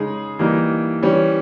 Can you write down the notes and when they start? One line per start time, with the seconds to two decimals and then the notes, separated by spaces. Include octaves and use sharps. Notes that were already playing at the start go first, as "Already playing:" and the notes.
Already playing: C#3 G#3 D#4 G#4
0.39 E3 G3 A#3 D#4
1.02 E3 G3 C#4